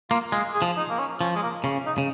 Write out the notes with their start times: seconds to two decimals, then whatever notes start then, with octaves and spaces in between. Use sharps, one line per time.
0.10 A#3 F4
0.32 G#3 F4
0.54 G#4
0.62 F3
0.77 D#4
0.90 A#3
0.98 C#4
1.21 F3 C#4
1.35 G#3
1.42 A#3
1.64 C#3 C#4
1.86 D#4
1.98 C#3